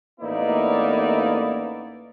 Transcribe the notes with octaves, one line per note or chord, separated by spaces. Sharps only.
A1 A#3 B3 D#4 E4 D5